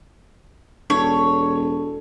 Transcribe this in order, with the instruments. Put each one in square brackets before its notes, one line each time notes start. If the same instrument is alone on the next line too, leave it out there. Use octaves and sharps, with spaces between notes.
[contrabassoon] E1 [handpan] D4 [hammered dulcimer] A4 [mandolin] C#5